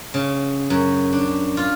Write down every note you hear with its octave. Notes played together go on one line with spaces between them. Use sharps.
C#3
F#2
D4
F4